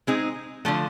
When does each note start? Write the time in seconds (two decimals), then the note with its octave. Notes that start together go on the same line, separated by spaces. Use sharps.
0.07 G#3 C4 D#4 G#4
0.65 D3 F3 A3